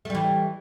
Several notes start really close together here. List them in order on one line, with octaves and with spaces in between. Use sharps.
A3 G3 E3